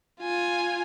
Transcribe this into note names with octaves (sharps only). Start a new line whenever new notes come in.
F4 G#5